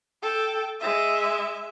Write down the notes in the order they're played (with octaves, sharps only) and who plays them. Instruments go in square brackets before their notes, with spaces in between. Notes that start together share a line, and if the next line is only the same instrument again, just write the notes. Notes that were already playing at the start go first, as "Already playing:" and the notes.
[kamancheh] A4 G5
G#3 E5